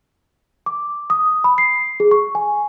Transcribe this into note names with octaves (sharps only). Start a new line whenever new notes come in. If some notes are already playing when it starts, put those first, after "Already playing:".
D6
D#6
B5
C7
G#4
C#6
G#5